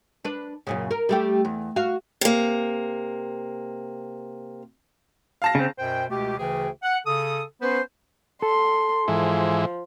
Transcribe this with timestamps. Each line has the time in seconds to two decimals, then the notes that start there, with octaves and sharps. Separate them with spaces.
0.25 D4 B4
0.67 F#2 A#2 C#3
0.91 A#4
1.09 G3 A3 G4
1.45 E2
1.76 F#4 F5
2.21 C3 A#3
5.42 F5 A5 A#6
5.55 C#3 C4
5.78 F#2 B2 C5 G5
6.09 C#2 B2 A3 G4
6.39 D2 C#3 E3 G#4 G5
6.83 F#5
7.06 C#3 A4 D#6
7.61 B3 C#4 B4 C5
8.42 A4 C6
9.08 G#2 E3 F3